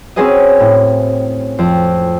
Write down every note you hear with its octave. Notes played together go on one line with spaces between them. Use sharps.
C4 C#4 F#4 G#4 B4 D#5
A2
F2